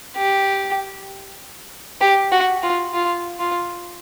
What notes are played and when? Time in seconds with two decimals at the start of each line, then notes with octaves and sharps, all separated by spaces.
0.17 G4
2.01 G4
2.32 F#4
2.63 F4
2.93 F4
3.39 F4